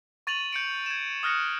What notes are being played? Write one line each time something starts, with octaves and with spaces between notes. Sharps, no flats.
C#6 A6 D#7 F7 F#7
G6 C#7 D7
G#6 E7
D#6 F6 F#6 A#6 C#7